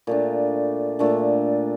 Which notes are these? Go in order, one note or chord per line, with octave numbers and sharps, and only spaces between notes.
A#2 A3 D4
A#2 A3 D4